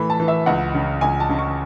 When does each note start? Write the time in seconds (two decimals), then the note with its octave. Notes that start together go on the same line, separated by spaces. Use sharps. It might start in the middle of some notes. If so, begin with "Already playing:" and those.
Already playing: A2 E3 A3 B5
0.10 A5
0.20 E3
0.28 E5
0.46 C#2 F#5
0.74 C#3
1.01 C#2 G#5
1.20 A5
1.29 C#3
1.39 C#6